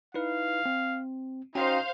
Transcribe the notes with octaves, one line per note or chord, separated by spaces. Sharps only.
D#4 E4 B4 F5
C4
C#4 D#4 F#4 C5 F5 G5